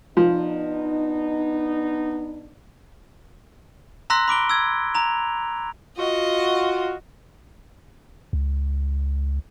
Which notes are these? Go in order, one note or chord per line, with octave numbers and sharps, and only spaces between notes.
F3 B3 D4 D#4
A#5 C6 E6 F#6 A#6 B6
B5 D6 D7 G7
E6 G#6
A#5 F7
F4 F#4 D#5
C#2